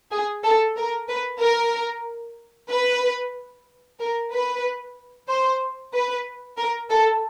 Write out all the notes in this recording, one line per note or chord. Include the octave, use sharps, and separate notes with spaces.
G#4
A4
A#4
B4
A#4
B4
A#4
B4
C5
B4
A#4
A4